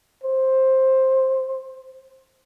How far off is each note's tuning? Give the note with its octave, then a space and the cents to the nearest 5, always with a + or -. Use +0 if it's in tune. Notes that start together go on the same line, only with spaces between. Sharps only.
C5 +10